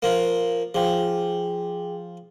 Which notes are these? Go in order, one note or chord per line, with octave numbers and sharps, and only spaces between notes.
F3 A#3
F3 G#4 G5